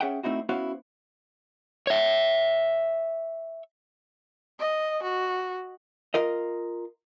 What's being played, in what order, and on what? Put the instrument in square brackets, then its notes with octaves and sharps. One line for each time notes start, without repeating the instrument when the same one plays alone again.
[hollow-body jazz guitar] C#4 G#4 E5 F#5 G5
A3 C4 D#4 E4 F#4
B3 C#4 E4 F#4 C5 F5
[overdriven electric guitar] C#5 E5
[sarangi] D#5
F#4
[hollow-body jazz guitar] F4 A#4 D#5